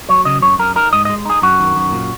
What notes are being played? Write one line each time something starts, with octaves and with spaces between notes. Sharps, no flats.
F#3 C#5
C#3 D#5
F#2 C#5
F#2 A#4
D#4 A#4
G#2 D#5
D#5
G#3
D#4 G#4
F#2 F#4
D#3
F#2
A#2